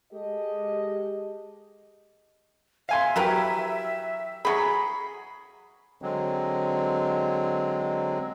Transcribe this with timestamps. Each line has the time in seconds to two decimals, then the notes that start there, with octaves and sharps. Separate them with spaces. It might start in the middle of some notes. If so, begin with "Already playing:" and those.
0.12 G#3 G4 A4 D#5
2.89 E5 F5 G#5 C6
3.16 F#3 E4 G4 A#4 B4
4.45 F#3 G#4 B5
6.02 D3 F#3 G#3 C4